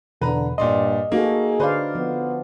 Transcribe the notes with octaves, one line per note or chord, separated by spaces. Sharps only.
E2 B2 D3 B4 A#5
G2 A#2 D5 D#5 C6
A#3 D#4 F#4 G#4 A4
D3 B4 C5 D5 F5
F3 B3